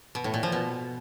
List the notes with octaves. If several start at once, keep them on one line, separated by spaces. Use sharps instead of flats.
B2
A2
A#2
F3
B2